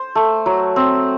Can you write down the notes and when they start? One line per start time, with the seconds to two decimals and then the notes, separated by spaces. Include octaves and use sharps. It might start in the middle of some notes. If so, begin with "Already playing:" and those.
Already playing: C5
0.15 A3
0.46 F#3
0.76 C4